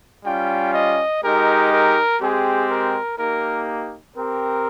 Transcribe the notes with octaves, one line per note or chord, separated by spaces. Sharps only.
G3 C#4 F4 G5
D#5
G#3 D#4 G4 A#4
A#4
G#3 C4 G4 G#4
A#4
A#3 D#4 G4 A#4
C4 G4 A#4